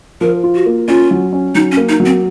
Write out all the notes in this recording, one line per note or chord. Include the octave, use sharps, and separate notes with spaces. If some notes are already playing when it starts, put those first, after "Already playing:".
F3 A#4
F4
F#4
A#3
C#4 F4
F#3
C#4
F#3 D#4
C#4
A#3
D#4
F#3
C4